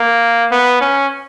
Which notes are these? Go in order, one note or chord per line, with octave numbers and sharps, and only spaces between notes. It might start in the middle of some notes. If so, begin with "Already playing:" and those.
Already playing: A#3
B3
C#4